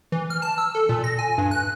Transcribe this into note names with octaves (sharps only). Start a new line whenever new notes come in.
E3
F6
A5
E6
A4
A#2
A#6
G#5
G2
F#6